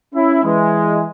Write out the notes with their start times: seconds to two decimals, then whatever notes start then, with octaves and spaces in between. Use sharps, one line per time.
0.15 C#4 E4
0.43 E3 G#3